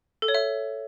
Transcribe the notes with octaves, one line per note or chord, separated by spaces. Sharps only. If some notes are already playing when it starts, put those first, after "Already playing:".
A4
C#5
E5